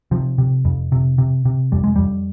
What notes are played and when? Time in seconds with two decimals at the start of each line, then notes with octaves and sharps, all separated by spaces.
0.11 C3 F3
0.38 C3
0.65 F2
0.92 C3
1.18 C3
1.45 C3
1.72 F2 G3
1.84 G#3
1.96 F2 G3